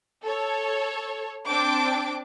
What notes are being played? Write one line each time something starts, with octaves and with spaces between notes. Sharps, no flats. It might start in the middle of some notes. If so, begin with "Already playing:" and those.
A4 C#5
C4 D4 G5 A5 D6